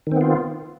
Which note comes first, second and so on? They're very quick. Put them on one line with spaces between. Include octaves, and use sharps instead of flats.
D#3 C4 B3 F4